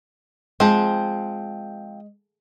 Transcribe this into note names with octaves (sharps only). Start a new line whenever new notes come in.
F3 G#3 C4